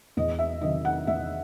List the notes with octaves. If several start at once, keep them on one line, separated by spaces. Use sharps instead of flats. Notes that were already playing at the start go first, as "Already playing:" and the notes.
E2 D#5
E5
C3 D#3 F#3 D#5
F#5
E2 E5